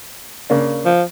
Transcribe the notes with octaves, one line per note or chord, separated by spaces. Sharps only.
C#3 A#3 D4
F3